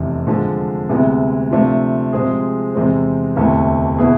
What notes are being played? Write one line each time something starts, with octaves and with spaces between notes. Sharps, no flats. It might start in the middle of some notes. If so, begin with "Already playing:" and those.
Already playing: F1 E2 C3
D3 F3 G#3
D2 C3 G#3 B3 E4
C3 F3 A3 D4 F4
C3 F3 G#3 C4 G#4
E2 C3 G#3 C4
E1 D2 C3 E3 A3
B2 B3 E4 G#4